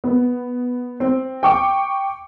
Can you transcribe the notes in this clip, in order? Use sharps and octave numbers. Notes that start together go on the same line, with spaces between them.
B3
C4
G5 C#6 D6